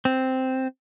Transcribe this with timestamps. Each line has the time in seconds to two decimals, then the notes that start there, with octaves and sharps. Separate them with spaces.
0.05 C4